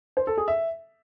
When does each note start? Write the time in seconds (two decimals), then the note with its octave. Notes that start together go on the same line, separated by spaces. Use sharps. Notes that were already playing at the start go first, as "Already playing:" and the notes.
0.17 C5
0.27 A4
0.37 G#4
0.48 E5